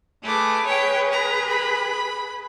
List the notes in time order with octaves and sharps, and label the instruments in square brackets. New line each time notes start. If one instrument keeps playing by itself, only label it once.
[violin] A3 D6 [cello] G#4 B4
[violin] C#5 G5
A#5
B5